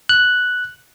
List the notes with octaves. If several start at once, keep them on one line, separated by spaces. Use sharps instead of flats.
F#6